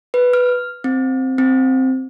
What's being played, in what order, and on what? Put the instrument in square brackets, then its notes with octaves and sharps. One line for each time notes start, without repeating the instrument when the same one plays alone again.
[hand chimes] B4
F6
C4
C4